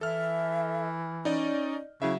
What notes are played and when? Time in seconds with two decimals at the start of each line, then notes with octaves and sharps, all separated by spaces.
0.01 E3 A4 E5 F6
1.25 C#4 D#4 D5 D#5
2.02 C#3 F#3 E4 E5